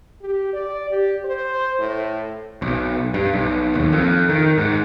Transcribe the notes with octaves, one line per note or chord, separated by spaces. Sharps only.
G4
D5
G4
C5
A2
B1
G2
B1
D#2
F2
D#3
G#2